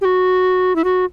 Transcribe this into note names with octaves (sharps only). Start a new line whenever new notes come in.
G4
F#4
E4
F#4